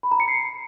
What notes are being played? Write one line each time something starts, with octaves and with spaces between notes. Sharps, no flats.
B5
A#5
C#7
C7